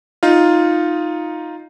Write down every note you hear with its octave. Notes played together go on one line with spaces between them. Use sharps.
D#4 F4